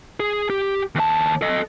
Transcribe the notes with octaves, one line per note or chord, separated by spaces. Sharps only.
G#4
G4
D#2 A5
A4 D#5